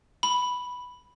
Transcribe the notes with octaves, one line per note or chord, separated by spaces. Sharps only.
B5